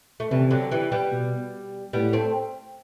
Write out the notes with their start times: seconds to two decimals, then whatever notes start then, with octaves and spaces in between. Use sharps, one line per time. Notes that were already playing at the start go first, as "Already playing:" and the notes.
0.20 A3
0.31 C3 E3 G3
0.51 D3 F#3
0.71 E3 G3
0.92 G3 B3
1.12 B2
1.93 A2 G3 B3
2.13 A3 C4